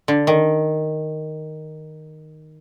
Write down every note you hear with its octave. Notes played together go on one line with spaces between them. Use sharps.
D3
D#3